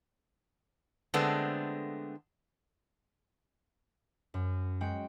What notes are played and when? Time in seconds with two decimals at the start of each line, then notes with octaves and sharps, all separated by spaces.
1.14 D3 G#3 A3 B3 C4 D4
4.34 F#2
4.81 G#3 F#4 G5